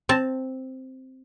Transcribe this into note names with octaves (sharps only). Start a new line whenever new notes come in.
C4 A5